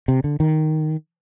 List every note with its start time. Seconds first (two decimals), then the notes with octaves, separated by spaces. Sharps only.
0.08 C3
0.24 D3
0.40 D#3